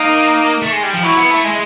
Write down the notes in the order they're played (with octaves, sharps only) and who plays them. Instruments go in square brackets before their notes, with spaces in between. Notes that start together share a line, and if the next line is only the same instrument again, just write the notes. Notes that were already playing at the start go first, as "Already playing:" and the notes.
Already playing: [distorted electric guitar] A#3 [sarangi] D#4
[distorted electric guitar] A3
G#3
G3
F3
[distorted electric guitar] F#3 [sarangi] E4
[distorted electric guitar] B3
A3
G#3